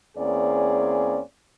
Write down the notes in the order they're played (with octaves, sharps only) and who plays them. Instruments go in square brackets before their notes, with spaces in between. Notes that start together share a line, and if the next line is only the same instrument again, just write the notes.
[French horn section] E2 A#3 C4 C#4 G#4 D5